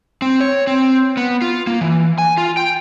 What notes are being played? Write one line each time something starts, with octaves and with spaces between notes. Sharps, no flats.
C4
C#5
C4
B3
F4
A#3
E3
G#5
F4
G5